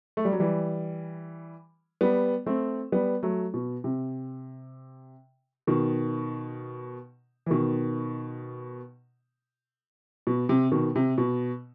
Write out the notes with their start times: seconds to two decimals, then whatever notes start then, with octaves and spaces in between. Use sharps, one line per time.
0.17 A3
0.25 G3
0.32 F#3
0.40 E3 G3
2.01 G3 B3
2.46 A3 C4
2.92 G3 B3
3.23 F#3 A3
3.54 B2
3.84 C3
5.67 B2 D#3
7.46 E3
7.50 B2 D#3
10.27 B2
10.49 C3
10.71 B2 D#3
10.96 C3
11.18 B2